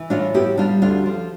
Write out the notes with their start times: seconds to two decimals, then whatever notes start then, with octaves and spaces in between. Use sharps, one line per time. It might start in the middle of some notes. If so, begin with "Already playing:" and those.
Already playing: E3
0.10 A2 D4 F4
0.34 B3 E4 G4
0.57 G3 D4 F4
0.82 D2 D4 F4
1.06 F3